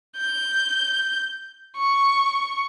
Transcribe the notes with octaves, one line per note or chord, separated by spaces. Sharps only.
G6
C#6